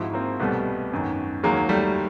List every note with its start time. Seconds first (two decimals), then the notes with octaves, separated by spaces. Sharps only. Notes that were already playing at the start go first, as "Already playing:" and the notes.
Already playing: G#1 G#2 F3 E4 F#4
0.13 A#3 C4
0.40 C2 B2 G3 A3 B3
0.91 G#1 F#2 D#3
1.43 D#2 D#3 F#3 G#3 A#3
1.69 G3 A3